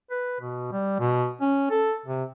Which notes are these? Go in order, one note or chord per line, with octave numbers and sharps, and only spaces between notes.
B4
B2
G3
B2
C#4
A4
C3